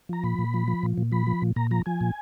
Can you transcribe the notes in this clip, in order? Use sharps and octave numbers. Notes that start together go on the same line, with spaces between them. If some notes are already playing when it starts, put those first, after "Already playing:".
F3 A#5
A#2 B5
A#2
F3
F3
A#2
A#2
F3 B5
F3
A#2
A#2 A#5
F3 A#5
F3 G#5
A#2